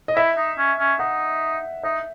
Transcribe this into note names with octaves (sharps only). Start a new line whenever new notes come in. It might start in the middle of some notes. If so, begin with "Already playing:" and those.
D#5
E4 E5
D#4
C#4
C#4
D#4 F#5
D#4 E5